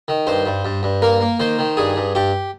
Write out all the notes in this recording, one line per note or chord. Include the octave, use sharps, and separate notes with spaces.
D#3
G2 C5
G2
G2
G2
A#3 A#4
A#3
D#3 C5
D#3
G2 G#4
G2
G2 G4